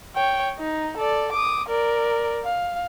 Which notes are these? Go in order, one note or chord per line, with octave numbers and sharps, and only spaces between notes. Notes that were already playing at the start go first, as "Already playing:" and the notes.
C#5 G5
D#4
A4 D5
D6 D#6
A#4 D5
F5